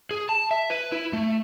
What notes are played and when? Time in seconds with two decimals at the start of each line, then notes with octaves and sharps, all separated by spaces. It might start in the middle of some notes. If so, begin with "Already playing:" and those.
0.11 G#4
0.29 A5
0.51 E5
0.70 B4
0.92 E4
1.13 A3